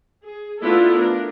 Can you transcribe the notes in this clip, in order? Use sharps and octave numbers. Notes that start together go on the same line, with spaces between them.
G#4
A3 B3 D4 E4 F4 A4
D4 A#4